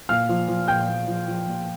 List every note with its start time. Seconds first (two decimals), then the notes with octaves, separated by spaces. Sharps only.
0.09 A#2 F5 F6
0.29 F3
0.48 F3
0.68 A#2 G5 G6
0.88 A#2
1.08 F3
1.28 F3
1.47 A#2